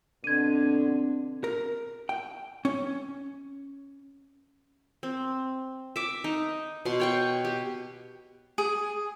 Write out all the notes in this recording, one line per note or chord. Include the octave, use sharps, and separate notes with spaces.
B2 D3 C4 D4 G#6 D#7
A#4
G5
C#4
C4
E5 D6
D#4
B2 C6
C#5 G5 C#6
G4
G#4